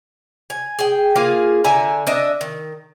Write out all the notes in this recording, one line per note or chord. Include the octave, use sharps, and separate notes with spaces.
G#5
G#4 G5
A#3 F4 G#4 F5
D3 E5 G#5 A#5
D4 D#5 E5
D#3